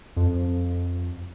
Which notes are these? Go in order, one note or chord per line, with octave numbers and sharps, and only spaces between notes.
F2